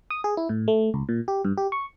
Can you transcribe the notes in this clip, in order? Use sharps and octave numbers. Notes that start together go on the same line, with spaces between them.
D#6
G#4
E4
A2
A3
C#2
A#2
G4
G2
G4
C#6